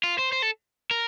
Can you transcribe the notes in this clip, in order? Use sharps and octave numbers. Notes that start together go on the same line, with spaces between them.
F4
C5
C5
A4
A#4